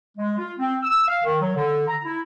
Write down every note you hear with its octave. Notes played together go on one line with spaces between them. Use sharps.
G#3
F4
C4
E6
F5
D#3
F#3
D3
A#5
E4